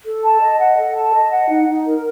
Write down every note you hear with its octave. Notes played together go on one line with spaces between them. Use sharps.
A4
A5
D#5
F#5
A4
A5
D#5
F#5
D#4
D#4
A#4